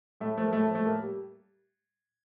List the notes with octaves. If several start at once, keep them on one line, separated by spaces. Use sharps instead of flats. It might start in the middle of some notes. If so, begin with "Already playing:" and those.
A2 A3
F3 A3
A#3
A2 A3
F3 A3
A2 A#3
G3